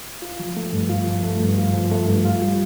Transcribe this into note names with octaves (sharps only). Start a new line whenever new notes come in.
F4
F3
A3
G2
F4
F3
A3
G2
F4
F3
A3
G2
F4
G3